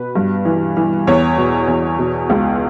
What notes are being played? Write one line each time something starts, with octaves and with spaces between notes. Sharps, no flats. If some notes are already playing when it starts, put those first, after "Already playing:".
Already playing: B2 B4
G2
E3
E3
E2 C#5
B2
E2
B2
C#2